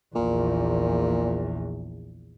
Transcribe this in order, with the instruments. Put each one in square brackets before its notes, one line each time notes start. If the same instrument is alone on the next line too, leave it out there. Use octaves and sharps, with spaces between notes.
[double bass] A#1 E2 [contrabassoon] A#2